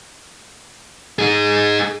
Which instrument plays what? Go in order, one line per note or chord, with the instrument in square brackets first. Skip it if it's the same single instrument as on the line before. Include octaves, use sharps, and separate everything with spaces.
[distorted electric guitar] D#4 G#4